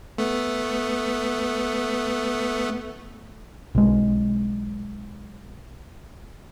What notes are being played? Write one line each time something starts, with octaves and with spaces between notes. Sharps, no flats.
A3 B3
B1 G#3